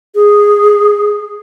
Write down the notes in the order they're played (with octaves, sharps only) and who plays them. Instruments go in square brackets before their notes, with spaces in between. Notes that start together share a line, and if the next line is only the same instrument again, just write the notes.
[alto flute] G#4